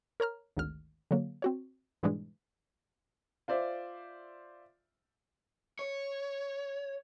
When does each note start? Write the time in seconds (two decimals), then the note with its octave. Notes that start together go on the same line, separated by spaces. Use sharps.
0.20 A#4 C#5 A#5 F6
0.57 G#1 D2 F6
1.11 D3 F#3 A#3
1.42 C4 F#4 C#5
2.03 G#2 B2 E3 G3 G#3 D4
3.48 F4 C5 D5 E5
5.79 C#5